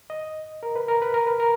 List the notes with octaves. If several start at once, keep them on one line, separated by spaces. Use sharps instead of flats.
D#5
A#4
B4
A#4
B4
A#4
B4
A#4